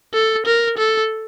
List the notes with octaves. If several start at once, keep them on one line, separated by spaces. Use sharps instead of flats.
A4
A#4
A4